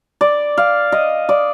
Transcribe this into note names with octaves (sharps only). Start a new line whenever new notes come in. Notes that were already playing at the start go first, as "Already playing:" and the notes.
D5
F5
D#5
D5